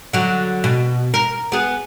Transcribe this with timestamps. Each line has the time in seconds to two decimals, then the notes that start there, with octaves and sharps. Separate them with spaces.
0.13 D3 F#3
0.64 B2
1.14 A#4
1.52 B3 G#4